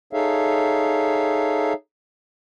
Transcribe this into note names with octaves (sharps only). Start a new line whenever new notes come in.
D#4 G#4 A4 C#5 E5 F5